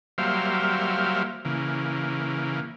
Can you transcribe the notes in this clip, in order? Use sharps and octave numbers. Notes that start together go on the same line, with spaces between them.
F#3 G3 A#3 C5 E5 F5
C#3 E3 A#3